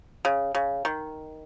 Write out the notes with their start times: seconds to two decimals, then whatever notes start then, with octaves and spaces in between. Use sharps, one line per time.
0.25 C#3
0.55 C#3
0.85 D#3